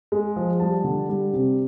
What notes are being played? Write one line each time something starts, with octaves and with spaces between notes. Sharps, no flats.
G#3
F3
G3 A5
D3
G3
C3